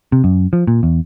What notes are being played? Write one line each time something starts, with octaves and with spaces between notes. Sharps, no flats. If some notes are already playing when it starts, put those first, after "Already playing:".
C3
F#2
F3
A#2
E2